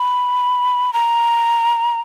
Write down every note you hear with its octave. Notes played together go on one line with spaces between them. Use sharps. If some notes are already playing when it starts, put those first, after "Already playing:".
Already playing: B5
A#5